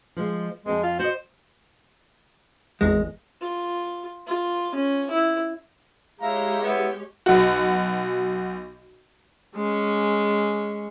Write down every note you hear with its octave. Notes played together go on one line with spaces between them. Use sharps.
F3 G#3
F2 G#3 C4
F4
F#4 C5 D#5
G#1 E2 G#3 A#6
F4
F4
C#4
E4
G#3 E4 G4 C#5 F5 A#5
B3 E4
B1 F#4
G#3 C#4